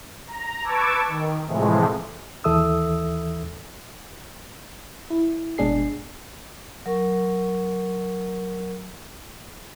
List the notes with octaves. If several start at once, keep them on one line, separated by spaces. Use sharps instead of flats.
A#5
B4 A5 C#6 D6 E6 G#6
D#3
A2 C3 E3 F3 G#3 A3
D#2 E3 A4 E5 D#6 E6
E4
G1 B2 G#3 D4 G#4 C7
F#3 A#4 C#6